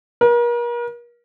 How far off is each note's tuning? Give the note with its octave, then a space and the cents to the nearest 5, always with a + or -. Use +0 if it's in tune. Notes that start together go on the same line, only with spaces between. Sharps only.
A#4 +40